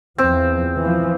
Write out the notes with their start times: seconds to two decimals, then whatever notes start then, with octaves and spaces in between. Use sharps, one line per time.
0.18 E2 F3 C4
0.80 E3 F3